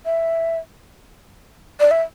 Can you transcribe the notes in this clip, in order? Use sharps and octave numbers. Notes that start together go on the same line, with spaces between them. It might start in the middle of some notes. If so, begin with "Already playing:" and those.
E5
D5
E5